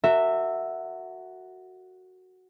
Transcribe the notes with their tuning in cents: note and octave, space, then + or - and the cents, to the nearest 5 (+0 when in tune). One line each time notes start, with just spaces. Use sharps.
F#4 +0 A#4 -35 E5 +0